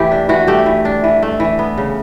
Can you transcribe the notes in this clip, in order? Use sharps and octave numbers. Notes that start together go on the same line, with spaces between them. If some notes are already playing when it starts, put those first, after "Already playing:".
Already playing: E3 A3 G4
D4
E3 F#4
A3 G4
E3
D4
E3
A3
E3
B3
C#3